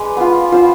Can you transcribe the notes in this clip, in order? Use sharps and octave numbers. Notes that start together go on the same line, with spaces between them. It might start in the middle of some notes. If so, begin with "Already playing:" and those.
Already playing: G#3 D4 B4
B3 F4
B3 F4 C5